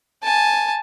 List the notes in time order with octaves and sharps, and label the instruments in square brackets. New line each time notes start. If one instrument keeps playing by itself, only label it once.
[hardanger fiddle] G#5 A5